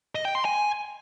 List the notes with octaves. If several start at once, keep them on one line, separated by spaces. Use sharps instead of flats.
D#5
G5
C6
G#5